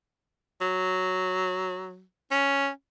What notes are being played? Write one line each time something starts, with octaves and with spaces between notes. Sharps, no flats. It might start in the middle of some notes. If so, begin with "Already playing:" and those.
F#3
C#4